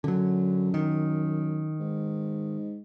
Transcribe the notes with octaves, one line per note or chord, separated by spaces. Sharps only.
F#2 D3 F#3
D#3
G#2